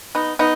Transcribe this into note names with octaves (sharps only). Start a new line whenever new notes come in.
B3 D#4
B3 D#4